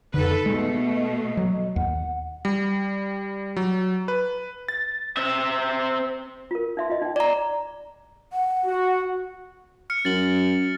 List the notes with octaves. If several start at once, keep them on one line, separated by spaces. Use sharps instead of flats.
F2 D3 D#4 A4 B4
B2 G#3 A3
D#5
F#3
D#2 F#5
G3
F#3
B4
A6
C4 E5
F4 A#4
D#4 E5 C6
F4 D#5
D#4 G5
D5 A#5
F#5
F#4
F6 C#7
F#2 A6 F#7